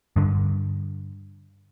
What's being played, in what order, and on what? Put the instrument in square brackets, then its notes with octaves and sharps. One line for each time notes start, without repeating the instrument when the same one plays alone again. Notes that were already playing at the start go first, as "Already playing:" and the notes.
[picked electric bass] G2 D3